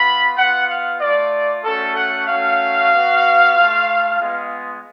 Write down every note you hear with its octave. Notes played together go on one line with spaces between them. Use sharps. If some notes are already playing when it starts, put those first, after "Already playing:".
Already playing: B3 F4 B5
B3 F4 F#5
F5
A3 F4 D5
A3 C#4 F#4 A4
F#5
A3 C#4 F#4 F5
B3 F#4
A3 F4
G#3 B3 F4